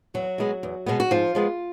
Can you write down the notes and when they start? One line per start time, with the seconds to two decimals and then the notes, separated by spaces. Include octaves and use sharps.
0.14 E2 F#3 F#4
0.38 B2 G#3 B3
0.63 E2
0.86 B2 G#3 B3
1.00 F#4
1.11 G#2 F3 F4
1.35 F3 G#3 B3